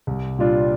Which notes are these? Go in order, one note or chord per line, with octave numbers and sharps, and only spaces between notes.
C2
A#2 G3 D4 F4